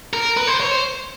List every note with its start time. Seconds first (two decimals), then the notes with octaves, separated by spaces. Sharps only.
0.13 A#4
0.37 B4
0.47 C5
0.60 C#5
0.71 C5